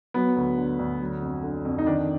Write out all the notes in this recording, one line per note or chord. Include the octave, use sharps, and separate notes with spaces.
F#3 B3
D2
D3
D2
F#3
F2
D3
F2
D#4
D#3 D4